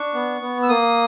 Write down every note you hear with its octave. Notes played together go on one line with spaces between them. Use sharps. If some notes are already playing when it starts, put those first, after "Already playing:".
Already playing: D4 C#6
B3
B3
E6
A#3 D#6